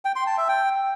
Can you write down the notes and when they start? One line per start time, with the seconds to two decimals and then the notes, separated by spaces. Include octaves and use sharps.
0.05 G5
0.16 C6
0.27 A5
0.38 E5
0.48 G5